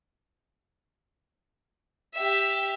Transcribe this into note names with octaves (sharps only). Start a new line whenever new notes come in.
G4 E5